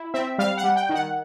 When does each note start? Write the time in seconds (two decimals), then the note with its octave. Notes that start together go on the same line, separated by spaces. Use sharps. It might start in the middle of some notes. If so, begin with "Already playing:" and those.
Already playing: E4
0.14 C4 E5
0.38 G3 F5
0.57 F#5
0.64 G3
0.76 G5
0.89 D#3
0.95 F#5